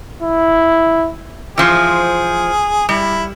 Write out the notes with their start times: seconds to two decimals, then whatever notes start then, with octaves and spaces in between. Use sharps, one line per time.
0.23 E4
1.58 E3 F3 G#4 C5
2.89 G3 E4